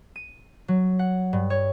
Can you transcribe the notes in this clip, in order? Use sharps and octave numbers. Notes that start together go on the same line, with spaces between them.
D#7
F#3
F#5
G2
C#5